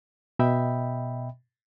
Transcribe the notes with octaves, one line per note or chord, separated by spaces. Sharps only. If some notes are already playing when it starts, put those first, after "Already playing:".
B2 D#5 E5 G5 B5